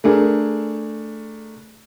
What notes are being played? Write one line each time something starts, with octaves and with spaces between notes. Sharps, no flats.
A3 D4 G#4 A#4